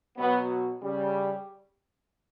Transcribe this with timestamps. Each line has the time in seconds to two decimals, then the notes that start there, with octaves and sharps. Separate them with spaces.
0.18 B2 F#3 B3
0.82 C#3 G3